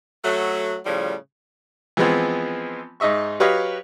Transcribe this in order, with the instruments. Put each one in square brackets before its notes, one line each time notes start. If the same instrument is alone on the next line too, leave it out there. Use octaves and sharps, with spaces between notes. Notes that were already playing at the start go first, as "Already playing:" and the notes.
[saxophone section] F#3 A3
A2 C#3 F3 G3
[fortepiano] E3 F3 G#3 B3 C4
G#2 D#4 D#5 E5 C#6
F#3 G4 B4 C#5 D#5 F5